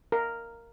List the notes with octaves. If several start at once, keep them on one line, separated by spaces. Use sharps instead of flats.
A#4